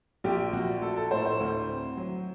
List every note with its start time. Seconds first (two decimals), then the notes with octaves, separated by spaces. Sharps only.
0.24 A#1 G4
0.53 A#1 F#4
0.82 A3 A4
0.96 A4
1.11 A2 C5
1.25 C5
1.40 D2
1.69 C4
1.97 F#3